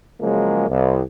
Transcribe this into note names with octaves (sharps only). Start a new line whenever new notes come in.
C#3 F3 F#3 G#3 A#3
C2